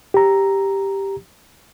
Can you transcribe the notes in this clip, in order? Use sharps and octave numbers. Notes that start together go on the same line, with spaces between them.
G4 A#5